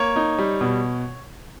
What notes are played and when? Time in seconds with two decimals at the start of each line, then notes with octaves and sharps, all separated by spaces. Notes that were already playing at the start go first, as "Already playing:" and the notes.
Already playing: A#3 C#5
0.16 D#4
0.38 G3
0.61 B2